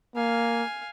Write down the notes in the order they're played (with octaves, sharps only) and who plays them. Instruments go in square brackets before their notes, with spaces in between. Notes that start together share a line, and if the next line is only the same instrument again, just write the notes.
[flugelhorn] A#3 [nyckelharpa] F5 G#5